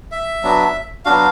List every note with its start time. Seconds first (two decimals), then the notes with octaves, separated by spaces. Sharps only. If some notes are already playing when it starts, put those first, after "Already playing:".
0.11 E5
0.43 F#3 B3 D4 F#4
1.05 F#3 B3 D4 F#4 F5